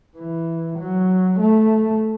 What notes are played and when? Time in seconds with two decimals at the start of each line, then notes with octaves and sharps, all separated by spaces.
0.17 E3
0.79 F#3
1.39 A3